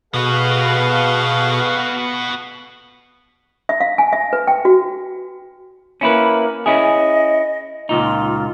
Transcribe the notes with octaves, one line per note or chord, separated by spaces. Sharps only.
B2 B3 F#4 G#4 A4 B4 F5
E5
F5
G#5
E5
B4
G5
F#4
A#3 C#4 E4 B4
C#4 E4 G#4 D#5
C#2 A#2 D#4 F4